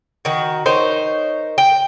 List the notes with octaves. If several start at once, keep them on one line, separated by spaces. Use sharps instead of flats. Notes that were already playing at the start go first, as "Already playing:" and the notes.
D#3 F#4
D#4 A#4 C5 C#5
G5